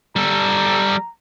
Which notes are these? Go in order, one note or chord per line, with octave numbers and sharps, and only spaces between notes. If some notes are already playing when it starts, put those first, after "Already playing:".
G3 A4 A#5